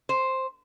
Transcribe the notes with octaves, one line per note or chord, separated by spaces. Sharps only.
C5